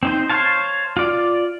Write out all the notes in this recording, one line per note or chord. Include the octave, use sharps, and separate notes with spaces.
C4 D#4 C5
C5 C#5 F5 A5
F4 D5